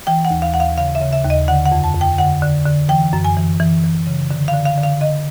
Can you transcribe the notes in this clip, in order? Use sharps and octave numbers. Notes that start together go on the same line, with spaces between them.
E3 G5
F#5
D#2
F5
D#2 F#5
F5
C#3 F5
E5
C#3
E5
D#2
D#5
D3 F#5
F#5
F2
A5
F2
G5
D3 F#5
D3
D3
E3 G5
F#2
G#5
E3
E3
E3
C#3
D3
F5
D3
F5
D3
F5
D3 D#5